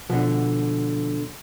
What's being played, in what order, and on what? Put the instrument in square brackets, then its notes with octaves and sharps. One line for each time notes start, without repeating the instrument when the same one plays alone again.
[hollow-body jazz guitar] B2 D3 [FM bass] F3